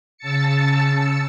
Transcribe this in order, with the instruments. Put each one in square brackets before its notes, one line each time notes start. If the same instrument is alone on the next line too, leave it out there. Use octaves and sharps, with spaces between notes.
[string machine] C#3 A5 E6 A6 C#7